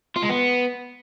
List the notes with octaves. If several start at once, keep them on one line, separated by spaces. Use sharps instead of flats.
F4
G#3
B3